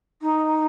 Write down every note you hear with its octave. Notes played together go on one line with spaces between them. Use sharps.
D#4